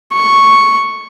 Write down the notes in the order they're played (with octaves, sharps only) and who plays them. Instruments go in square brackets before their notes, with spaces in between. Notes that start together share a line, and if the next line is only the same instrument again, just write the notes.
[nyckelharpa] C#6